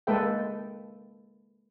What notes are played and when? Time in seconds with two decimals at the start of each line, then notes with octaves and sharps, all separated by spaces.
0.07 G#3 A#3 A4 B4 E5 G5